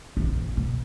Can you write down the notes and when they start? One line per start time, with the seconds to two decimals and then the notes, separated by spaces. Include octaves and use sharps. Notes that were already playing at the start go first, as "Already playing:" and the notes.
0.17 A#1 F2
0.57 B2